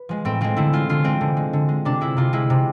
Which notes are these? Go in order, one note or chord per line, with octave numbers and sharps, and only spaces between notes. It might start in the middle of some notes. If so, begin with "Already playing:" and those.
Already playing: B4
F3 G#3
A2 C4
F3 G#3 C4
D3 E4
G#3 F4
D3 F4
G#3 C4
D3
G#3
D3
G#3
C3 D4
G#3 E4
C3 F4
G#3 E4
C3